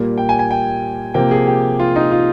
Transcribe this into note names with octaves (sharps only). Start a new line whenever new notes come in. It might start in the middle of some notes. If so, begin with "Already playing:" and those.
Already playing: A#2 G3 A#3
G5
G#5
G#5
G5
C3 F3 A#3 G5
G#4
G4
F4
D#4
F4